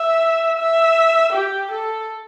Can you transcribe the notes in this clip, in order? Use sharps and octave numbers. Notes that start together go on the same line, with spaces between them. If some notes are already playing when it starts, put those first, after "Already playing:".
Already playing: E5
E5
G4
A4